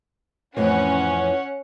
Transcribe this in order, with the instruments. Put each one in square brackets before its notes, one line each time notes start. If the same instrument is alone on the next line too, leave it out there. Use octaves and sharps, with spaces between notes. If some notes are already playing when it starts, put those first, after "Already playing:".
[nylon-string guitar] F2 A2 E3 [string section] C#4 F#5